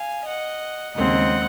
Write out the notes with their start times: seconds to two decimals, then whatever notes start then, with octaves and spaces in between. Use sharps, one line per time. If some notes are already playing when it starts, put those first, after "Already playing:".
Already playing: F5 G#5
0.24 D#5 F#5
0.95 D#2 C#3 G#3 C4 D#5 F#5